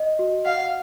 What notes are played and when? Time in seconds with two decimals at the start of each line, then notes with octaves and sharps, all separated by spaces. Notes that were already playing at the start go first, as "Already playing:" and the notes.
Already playing: D#5
0.19 F#4
0.46 F5 F#5